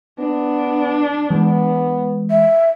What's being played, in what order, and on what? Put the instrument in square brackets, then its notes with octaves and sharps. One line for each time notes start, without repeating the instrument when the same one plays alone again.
[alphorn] B3 [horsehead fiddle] D4
[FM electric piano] E3 G#3 [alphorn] B3
[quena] E5